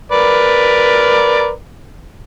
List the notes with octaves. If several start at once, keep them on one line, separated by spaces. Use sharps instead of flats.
A#4 B4 D5